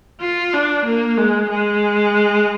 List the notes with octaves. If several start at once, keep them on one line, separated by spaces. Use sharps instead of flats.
F4
D4
A#3
G#3
G#3